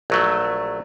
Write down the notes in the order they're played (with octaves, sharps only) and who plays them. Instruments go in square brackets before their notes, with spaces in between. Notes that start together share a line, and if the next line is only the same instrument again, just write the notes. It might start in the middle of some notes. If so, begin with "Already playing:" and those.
[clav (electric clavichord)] A#1 F#3 A3